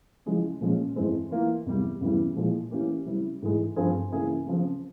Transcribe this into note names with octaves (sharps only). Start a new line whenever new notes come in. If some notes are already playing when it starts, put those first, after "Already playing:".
C#3 F3 G#3 E4
A#2 F3 G#3 C#4
F2 E3 G#3 C4
E3 A#3 F4
E2 C3 G3
E2 C#3 E3 G3
A#2 F3 G#3 E4
E3 A#3 C#4 G4
C#3 G3 C4 E4
G#2 E3 G#3
G2 F3 C4 F4 G#4
C#3 E3 A#3 E4 G#4
C#3 F3 C4